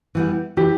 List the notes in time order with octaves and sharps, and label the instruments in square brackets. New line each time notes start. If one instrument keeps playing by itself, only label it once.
[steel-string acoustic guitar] E3 G3 B3
[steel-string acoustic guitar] E3 [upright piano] G4